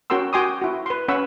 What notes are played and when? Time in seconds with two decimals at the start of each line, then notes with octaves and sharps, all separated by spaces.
0.10 C#4 F#4 A#4 G5 C6 E6
0.33 F#4 G5 G#5 C6 D6 D#6
0.62 E4 F#4
0.86 B4 C6
1.08 C#4 B4 F#5 B5 C#6 E6